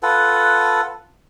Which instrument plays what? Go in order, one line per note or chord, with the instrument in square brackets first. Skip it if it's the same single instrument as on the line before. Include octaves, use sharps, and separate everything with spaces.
[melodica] F4 A4 B4 F#5